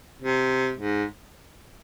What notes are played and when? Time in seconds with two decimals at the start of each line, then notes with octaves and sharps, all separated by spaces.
0.22 C3
0.78 G#2